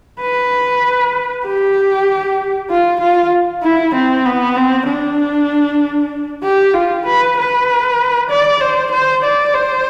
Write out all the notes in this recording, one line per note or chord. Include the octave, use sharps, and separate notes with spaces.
B4
G4
F4
F4
E4
C4
B3
C4
D4
G4
F4
B4
B4
D5
C5
C5
D5
C5